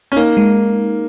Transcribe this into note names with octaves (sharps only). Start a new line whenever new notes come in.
C#4
A#3 D#4
G#3